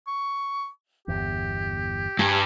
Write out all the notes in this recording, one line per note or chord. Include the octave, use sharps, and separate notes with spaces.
C#6
G1 E2 G4
G2 G#5